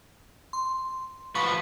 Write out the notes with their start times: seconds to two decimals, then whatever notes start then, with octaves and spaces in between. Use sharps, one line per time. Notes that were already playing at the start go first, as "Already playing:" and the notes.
0.53 C6
1.35 F3 B4 C#6